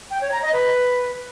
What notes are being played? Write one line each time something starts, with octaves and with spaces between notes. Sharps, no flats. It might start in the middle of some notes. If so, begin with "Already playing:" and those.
G5
C#5
A#5
D#5
B4